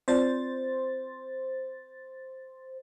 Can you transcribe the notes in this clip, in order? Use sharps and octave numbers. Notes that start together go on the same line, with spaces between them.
C4 F4 C5 D5 A6